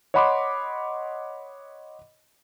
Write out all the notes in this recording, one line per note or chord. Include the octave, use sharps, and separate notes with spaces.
C#5 D#5 F#5 B5 C6 D6